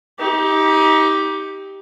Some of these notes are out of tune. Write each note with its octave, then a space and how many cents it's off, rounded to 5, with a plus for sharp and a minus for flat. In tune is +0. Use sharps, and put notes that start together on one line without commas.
D#4 +30 G4 +0